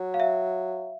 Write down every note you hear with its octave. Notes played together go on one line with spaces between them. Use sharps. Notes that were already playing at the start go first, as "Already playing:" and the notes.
Already playing: F#3
F5
E5